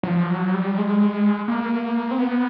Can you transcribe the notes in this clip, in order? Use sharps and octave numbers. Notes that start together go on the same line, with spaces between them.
F#3
F3
F#3
G3
G#3
A#3
C4
B3